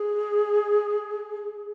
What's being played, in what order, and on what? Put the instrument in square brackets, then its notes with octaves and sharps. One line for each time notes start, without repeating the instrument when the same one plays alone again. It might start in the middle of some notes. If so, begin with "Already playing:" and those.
Already playing: [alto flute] G#4